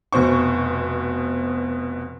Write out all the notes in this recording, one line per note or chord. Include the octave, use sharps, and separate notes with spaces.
F1 B2 C5 C#6